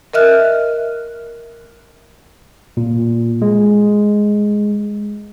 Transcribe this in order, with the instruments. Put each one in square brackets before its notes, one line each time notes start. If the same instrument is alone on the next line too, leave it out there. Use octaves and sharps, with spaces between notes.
[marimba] A#4 D#5 E5 F6 F#6
[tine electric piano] A#2
G#3